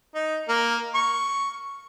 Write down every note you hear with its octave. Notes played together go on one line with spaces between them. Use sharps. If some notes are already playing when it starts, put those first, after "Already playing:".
D#4
A#3
C#6